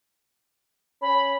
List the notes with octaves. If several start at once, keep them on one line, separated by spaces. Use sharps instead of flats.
C#4 B5